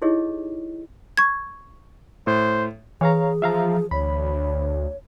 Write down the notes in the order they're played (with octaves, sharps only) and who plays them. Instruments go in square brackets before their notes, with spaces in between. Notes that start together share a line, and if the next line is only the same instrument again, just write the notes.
[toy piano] D#4 E4 G4 G#4 C#5 D#5
[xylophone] C#6 G#6
[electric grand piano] A2 [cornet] C5
[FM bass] E3 [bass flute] G#4 [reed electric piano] C#5 F5 A#5
[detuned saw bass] F3 [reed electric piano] E5 F5 A#5
[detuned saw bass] D2 [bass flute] C#5 [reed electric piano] B5